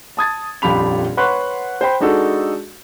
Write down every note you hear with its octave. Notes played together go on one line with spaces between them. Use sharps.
A5 D#6 G#6 A6
D#1 A#1 F2 G4 B5 F7
B4 C#5 F#5 C6 C#6 F#6
C5 G5 B5
G#3 D4 D#4 F#4 A4